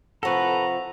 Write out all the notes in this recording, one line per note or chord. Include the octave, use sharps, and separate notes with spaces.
C3 F3 A4 B4 F#5 A#5 C#6